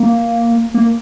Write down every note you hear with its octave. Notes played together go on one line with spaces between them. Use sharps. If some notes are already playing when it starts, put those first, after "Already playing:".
Already playing: A#3
A#3